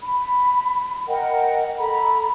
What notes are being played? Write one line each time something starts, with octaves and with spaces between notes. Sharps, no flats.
B5
A#4 D#5 F#5 G5
A4 A#5 B5